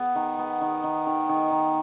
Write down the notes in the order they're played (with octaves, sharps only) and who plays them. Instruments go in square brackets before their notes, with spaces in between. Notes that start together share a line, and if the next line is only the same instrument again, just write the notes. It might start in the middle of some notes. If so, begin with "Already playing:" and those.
Already playing: [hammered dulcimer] B3
D#3
B3
D#3
D#3
D#3
D#3
D#3